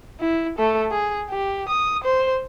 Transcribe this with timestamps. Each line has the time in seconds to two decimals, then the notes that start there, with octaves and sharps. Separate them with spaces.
0.19 E4
0.58 A3 A4
0.91 G#4
1.30 G4
1.69 D#6
2.04 C5